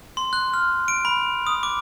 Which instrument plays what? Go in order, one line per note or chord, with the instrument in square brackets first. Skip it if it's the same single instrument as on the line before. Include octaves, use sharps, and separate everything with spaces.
[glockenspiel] C6
F#6
F6
D7
B5
D#6
D6